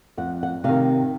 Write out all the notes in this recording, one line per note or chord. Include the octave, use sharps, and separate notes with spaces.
F2 F#5
F#5
C3 D#3 F5